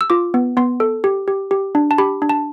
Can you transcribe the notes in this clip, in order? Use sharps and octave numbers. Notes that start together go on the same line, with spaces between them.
E6
F4 D6
B3
B3 C6
A4
G4
G4
G4
D4
A5
G4 B5
D4
A5